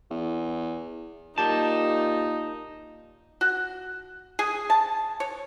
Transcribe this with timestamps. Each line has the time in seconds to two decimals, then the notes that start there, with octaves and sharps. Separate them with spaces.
0.10 E2
1.38 A#2 D#4 G4 A5
3.41 F#4
4.39 G#4
4.70 A5
5.20 C#5